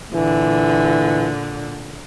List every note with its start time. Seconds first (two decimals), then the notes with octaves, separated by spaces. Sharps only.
0.14 A#2 D3 E3